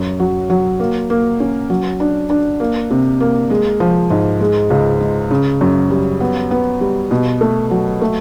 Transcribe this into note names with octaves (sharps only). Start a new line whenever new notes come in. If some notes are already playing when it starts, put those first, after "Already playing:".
Already playing: F#2
F#3
F#3
A#3
A#3
C#4
F#3
D4
D4
A#3
C3
A#3
G#3
F3
G#2
G#3
C#2
G#3
C#3
F#2
G3
B3
B3
G3
B2
A3
F#3
A3